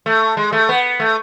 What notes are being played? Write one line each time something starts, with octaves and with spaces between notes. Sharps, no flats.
A3
G#3
A3
B3
A3